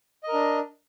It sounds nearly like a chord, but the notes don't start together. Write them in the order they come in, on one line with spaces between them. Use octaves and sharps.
D#5 A#4 D4